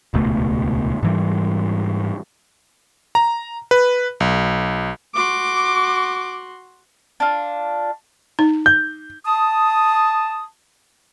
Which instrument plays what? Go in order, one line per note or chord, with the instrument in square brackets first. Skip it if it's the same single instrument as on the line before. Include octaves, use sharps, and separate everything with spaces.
[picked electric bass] D#1 C#2 B2 A3
G#2 E3 G3
[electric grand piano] A#5
B4
B1
[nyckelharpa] F#4 C6 [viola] D6
[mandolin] D4 F4
[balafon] D#4
[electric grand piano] G6
[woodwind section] A5 D#6